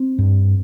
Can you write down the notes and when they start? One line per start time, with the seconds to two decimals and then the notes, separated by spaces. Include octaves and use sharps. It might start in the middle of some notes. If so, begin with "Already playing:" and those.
Already playing: C4
0.19 G2